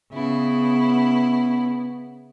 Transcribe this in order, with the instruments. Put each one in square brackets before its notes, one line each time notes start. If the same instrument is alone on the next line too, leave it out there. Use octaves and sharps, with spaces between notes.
[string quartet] C#3 E4 [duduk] B3